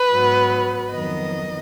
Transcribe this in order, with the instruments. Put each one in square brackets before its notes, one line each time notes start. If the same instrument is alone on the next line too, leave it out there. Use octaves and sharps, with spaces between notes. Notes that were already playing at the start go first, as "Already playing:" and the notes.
Already playing: [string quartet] B4
G#2 F#3 B3
F2 D#3 F#3 B3 D#5